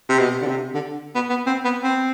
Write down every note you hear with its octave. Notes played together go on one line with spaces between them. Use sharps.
C3
B2
D3
C3
D3
B3
B3
C4
B3
C4